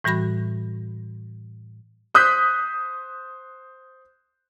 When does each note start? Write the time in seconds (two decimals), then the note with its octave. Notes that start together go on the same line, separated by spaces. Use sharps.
0.04 A2 E3 G3 F#4 B5 A#6
2.14 C5 D#6 F#6 G6 B6